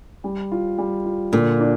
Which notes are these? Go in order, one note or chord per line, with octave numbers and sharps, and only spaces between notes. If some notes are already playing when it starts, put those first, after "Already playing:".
G3
F4
G3
F4
A#2 D3
D4